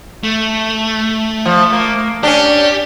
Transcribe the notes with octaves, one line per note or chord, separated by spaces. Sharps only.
A3
F3
A#3
C#4 D4 G4